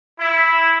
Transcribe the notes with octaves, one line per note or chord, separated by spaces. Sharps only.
E4